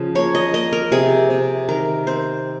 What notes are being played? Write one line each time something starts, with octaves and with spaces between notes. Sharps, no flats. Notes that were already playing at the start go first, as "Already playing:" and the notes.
Already playing: C#3 F3
A#3 C#5
D#5
A#3 D#5
A#4
C3 G#4
C3
D#3 A#4
C4 C5